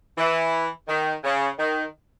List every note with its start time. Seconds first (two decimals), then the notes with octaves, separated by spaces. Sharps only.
0.18 E3
0.88 D#3
1.24 C#3
1.59 D#3